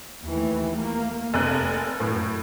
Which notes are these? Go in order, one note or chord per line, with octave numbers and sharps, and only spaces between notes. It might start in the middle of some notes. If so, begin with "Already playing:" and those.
D#2 E3 A3
A3 A#3
F1 A4 A#4 G#5 F#6
F#2 A2